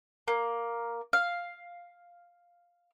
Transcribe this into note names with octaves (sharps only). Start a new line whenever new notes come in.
A#3
F5